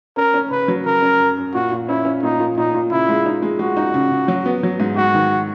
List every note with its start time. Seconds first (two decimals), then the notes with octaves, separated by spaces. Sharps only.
0.17 C#4 A#4
0.34 C#4
0.50 C#3 B4
0.68 F#3
0.85 C#3 A#4
1.02 C#4
1.19 F#2
1.37 F#2
1.54 A#2 F#4
1.72 A#2
1.88 C#4 E4
2.05 C#4
2.23 A#2 D#4
2.40 A#2
2.57 A#2 D#4
2.74 A#2
2.91 C#3 E4
3.09 G#3
3.26 D#4
3.42 G#3
3.59 G#3 F#4
3.77 D#4
3.94 C#3
4.11 C#3
4.28 F#3
4.46 B3
4.63 F#3
4.80 G#2
4.96 G#2 F#4
5.15 D#3